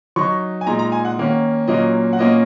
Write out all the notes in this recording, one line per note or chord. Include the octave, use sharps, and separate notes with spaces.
F#3 D#4 C#6
G#5
A#2 G#3 D#4 A#5
A#5
G#5
F#5
D#3 A#3 C#4
A#2 F#3 A#3 C#4 D#5
F#5
A#2 A#3 C#4 D#5